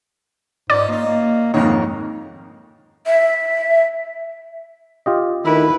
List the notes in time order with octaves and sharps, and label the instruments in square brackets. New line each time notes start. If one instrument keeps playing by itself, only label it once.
[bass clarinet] G#2 [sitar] C#4 D#4 F4 [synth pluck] D5
[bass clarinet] A#3 [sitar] D#4 F4
[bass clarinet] A#3
[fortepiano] F2 G#2 D#3 [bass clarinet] A#3 [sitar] C#5
[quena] E5
[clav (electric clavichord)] F4 G4 D#5
[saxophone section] D2 E4 [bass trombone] D#3 [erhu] B4